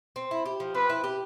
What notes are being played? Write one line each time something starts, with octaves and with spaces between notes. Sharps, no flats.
C4
E4
G4
F3
C4 B4
E4
G4